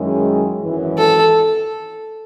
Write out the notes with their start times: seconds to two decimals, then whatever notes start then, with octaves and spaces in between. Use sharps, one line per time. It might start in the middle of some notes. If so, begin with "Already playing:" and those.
Already playing: F#2 D#3 G#3 C#4 E4
0.60 G#1 F#2 E3
0.98 A4